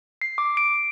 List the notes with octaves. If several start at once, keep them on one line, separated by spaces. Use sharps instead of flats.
C7
D6
D7